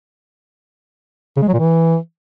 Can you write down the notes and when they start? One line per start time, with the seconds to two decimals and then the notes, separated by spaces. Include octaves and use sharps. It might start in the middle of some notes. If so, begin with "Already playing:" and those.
1.37 C#3
1.42 G#3
1.48 F#3
1.53 A#2
1.59 E3